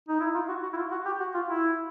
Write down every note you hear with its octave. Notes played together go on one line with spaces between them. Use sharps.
D#4
E4
F4
F#4
F#4
E4
F4
F#4
G4
F#4
F4
E4